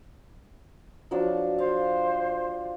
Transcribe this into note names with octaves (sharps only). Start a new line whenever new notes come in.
F3 F#3 D4
C5 F5